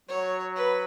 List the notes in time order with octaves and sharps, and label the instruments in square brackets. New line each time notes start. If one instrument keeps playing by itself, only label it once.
[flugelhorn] F#3 [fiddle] C#5
[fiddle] B4